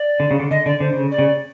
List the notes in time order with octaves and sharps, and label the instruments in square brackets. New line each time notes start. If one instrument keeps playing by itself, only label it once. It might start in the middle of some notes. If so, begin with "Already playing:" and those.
Already playing: [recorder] D5
[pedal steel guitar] D3
C#3
D3
[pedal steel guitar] D3 [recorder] D#5
[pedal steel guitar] D3 [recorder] D5
[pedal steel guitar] D3 [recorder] C5
[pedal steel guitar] C#3
[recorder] D5
[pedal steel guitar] C#3